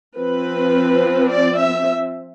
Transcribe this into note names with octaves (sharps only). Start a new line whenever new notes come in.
F3 C4 B4
D5
E5